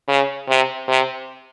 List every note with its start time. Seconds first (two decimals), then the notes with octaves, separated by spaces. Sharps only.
0.08 C#3
0.49 C3
0.88 C3